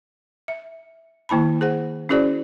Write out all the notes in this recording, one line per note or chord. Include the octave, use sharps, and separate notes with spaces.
E5
D#3 A#3 E4 A5 B5
G#4 C5 F#5
C#4 E4 F#4 G#4 C5 D5